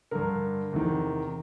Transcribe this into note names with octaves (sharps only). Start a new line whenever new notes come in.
G2 D3 A#4
E2 C3 D#3